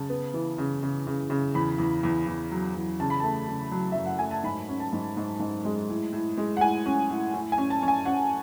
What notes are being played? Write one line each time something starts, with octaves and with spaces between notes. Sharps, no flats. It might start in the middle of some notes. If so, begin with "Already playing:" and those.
Already playing: C#3 A5
B3
E3
C#3
C#3
C#3
C#3
E2 B5
E2
E2
E2
F#3
E2
C#3 A5
B5
A3 A5
C#3
F#3
F#2 E5
F#5
A3 G#5
A5
G#2 B5
C#4
A5
G#2
G#2
G#2
G#3
A2
A2
G#3
F#5
A2 G#5
C#4
A2
A2
G#5
C#4
A5
C#4
G#5
C#4 F#5